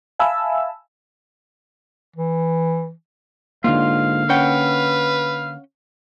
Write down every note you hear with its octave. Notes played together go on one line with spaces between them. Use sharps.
E5 F5 G#5 A5 B5 E6
E3
G#2 D3 A#3 F4 F5
C#4 B4 F#5 G5